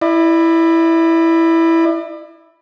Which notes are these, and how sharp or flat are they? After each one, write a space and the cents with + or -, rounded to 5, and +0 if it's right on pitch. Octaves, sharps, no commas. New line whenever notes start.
E4 +0 D5 +40